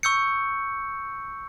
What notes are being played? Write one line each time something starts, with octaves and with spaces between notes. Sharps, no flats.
C#6 E6 G6 C#7